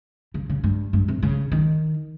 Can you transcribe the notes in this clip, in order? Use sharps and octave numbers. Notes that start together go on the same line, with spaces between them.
C#3
C#3
G2
G2
C3
C#3
D#3